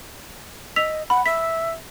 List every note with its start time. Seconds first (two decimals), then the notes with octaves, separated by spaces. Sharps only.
0.76 D#5 E6 B6 F7
1.10 F#5 B5
1.26 E5 B6